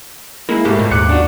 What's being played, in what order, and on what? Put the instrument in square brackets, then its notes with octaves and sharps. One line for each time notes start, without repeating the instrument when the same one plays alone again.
[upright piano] G#3 [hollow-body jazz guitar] A#3 [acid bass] E4
[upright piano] B1 A3 [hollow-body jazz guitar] G#2 [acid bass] G4
[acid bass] A#2
[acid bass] D#2 [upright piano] D6 F#6 C#7
[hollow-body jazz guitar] D4 F#4